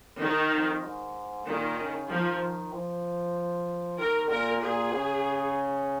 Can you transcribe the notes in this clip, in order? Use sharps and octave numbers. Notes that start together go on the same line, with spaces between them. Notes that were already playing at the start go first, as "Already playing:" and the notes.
D#3
F2
G#2
A#2 D#3
C#3
D#3 F3
F3
D#3 A#4
A#2 A#4
A#2 G#4
C#3